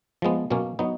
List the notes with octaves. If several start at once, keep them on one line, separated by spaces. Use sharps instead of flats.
F3 G#3 B3
B2 F#3 A#3 C#4
F#3 B3 D#4